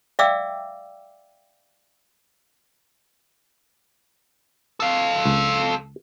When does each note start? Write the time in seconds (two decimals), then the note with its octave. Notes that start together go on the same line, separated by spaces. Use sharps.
0.19 D5 E5 F5 G5 D6 E6
4.80 A4 F5
5.26 C#2